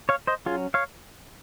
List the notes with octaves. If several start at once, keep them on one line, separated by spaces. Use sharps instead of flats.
C#5 F5
C5 D#5
F#3 C#4 F4 G#4
C#5 F5